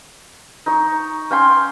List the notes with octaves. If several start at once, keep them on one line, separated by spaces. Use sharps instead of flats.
D#4 C#5
C#4 G5 C6